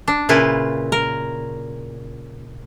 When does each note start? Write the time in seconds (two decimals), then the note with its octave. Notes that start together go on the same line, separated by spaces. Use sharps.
0.08 D4
0.29 A#2 C#3 E4 F4 B4
0.92 A#4